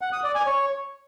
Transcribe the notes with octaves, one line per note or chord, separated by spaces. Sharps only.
F#5
D#6
D5
G#5
C#5